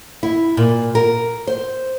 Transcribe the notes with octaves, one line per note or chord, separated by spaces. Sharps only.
E4
A#2
A#4
C5